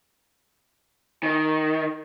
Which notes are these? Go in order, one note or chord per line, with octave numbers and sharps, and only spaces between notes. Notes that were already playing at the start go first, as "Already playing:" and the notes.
D#3